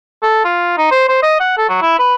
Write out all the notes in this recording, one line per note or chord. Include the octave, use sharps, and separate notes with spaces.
A4
F4
D#4
C5
C5
D#5
F#5
A4
F#3
E4
B4